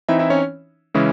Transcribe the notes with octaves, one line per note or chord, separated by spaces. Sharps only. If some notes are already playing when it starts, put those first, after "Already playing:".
E3 C4 D#4 E4 E5
E4 E5
C#4 C#5
C#3 E3 G#3 C#4 E4